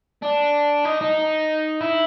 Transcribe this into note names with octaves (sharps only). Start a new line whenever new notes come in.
D4
D#4
D#4
E4